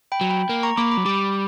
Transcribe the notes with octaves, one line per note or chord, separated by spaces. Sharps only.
G5 B5
F#3
G5 B5
A#3
A#5 C#6
A#3 B5 D6
B5 D6
F#3
G3 B5 D6